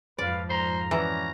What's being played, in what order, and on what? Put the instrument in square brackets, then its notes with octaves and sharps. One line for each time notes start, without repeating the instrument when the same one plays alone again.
[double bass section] F2 G#2 F3 [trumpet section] B4 F5 [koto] D5
[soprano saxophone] C5 [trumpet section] A#5
[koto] E3 [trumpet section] C#4 F#4 D5 [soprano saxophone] A#5